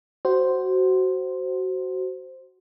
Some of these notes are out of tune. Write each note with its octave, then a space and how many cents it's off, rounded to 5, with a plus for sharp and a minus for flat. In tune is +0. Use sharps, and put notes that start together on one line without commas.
F#4 +20 C5 +0